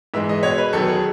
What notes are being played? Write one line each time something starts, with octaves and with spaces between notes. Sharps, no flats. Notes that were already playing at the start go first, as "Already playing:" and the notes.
G#2 E3 G#3 E5
D#5
B2 G#3 C#5
B4
E2 D#3 F#3 A4
G#4